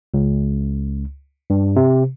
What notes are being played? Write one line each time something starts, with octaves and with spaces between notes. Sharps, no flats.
C#2
G2
C3